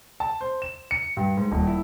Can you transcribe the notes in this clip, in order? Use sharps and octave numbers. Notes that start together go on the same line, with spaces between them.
A5
C5
E7
C#7
G2
G#2
D#1
E4